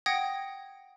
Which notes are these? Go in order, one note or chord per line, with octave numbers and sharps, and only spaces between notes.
F#5 G5 D#6 G#6 A#6